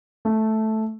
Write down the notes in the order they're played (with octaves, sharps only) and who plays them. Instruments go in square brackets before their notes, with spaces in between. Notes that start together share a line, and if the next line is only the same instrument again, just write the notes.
[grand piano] A3